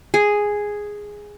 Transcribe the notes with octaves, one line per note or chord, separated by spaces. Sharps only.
G#4